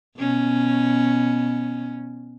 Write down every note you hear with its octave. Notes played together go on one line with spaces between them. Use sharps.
B2 C#4